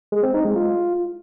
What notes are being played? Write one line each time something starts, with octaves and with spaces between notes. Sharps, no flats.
G#3
C4
D#4
G#3
F4